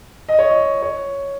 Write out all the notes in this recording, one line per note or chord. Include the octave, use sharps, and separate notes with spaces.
D#5
C#5
D#5
C#5